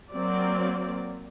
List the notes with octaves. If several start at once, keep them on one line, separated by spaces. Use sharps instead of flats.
F#3 A#3 C4 D5